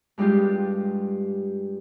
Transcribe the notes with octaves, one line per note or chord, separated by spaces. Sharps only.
G2 G3 G#3 F4 G4